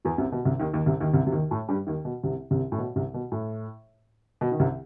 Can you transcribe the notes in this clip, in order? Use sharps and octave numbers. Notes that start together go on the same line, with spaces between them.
E2 E3
C2 C3
B2
C2 C3
D#2 D#3
D#2 D#3
C2 C3
D#2 D#3
C2 C3
C3
D#2 D#3
A2 A3
G2 G3
D#2 D#3
B2
C2 C3
C2 C3
A2
B2
C2 C3
B2
A2
B2
D#3
C2 C3